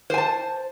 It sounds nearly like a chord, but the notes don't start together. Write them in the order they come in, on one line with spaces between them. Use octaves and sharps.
C5 G#5 A5